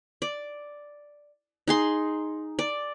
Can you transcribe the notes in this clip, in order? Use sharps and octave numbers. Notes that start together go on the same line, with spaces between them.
D5
D#4 G#4 C6
D5